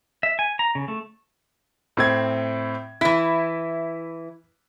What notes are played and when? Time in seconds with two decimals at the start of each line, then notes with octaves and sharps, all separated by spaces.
0.23 E5
0.39 G#5
0.59 A#5
0.75 C#3
0.88 A3
1.97 A2 C4 G#6
3.01 E3 E4 B6